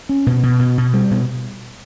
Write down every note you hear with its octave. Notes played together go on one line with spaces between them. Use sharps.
C#4
B2
B2
B2
B2
G3
B2